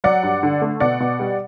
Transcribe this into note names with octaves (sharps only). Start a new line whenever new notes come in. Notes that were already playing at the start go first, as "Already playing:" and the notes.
F#3 D5 F#5
G2
D3
A3
B2 D5 F#5
B2
G3